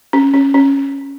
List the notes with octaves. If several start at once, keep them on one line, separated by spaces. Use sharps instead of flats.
C#4
C#4
C#4